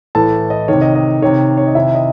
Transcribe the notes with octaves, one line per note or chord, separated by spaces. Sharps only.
A2 E3 A4 A5
D#5
C3 D#3 C#5
D#5
D#5
C3 D#3 C#5
C#5
D#5
C3 D#3 E4 E5
D#5